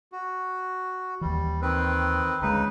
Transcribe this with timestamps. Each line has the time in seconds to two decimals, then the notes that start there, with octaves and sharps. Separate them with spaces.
0.12 F#4
1.21 D#2 E3 G3
1.62 D#3 C4 B4
2.42 D2 C#3 G#3 D#4 B4